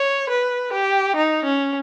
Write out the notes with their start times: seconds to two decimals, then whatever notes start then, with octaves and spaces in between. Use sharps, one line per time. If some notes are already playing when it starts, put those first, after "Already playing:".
Already playing: C#5
0.30 B4
0.73 G4
1.16 D#4
1.45 C#4